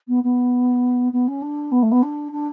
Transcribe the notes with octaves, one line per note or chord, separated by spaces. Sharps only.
B3
B3
B3
C#4
D4
B3
A3
B3
D4
D4